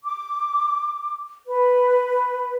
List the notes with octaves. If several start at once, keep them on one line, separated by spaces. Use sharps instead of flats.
D6
B4